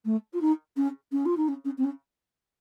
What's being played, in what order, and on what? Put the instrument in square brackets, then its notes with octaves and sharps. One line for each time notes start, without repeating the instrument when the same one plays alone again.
[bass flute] A3
F4
D#4
C#4
C#4
F4
D#4
C#4
C#4
C4
C#4